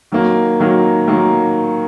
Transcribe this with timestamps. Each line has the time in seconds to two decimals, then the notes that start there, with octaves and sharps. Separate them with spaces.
0.12 D#3 F#3 A#3
0.60 D#3 F#3 A#3
1.07 D#3 F#3 A#3